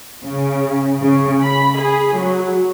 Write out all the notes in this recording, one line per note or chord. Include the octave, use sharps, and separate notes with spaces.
C#3
C#3
B5
G#4
F#3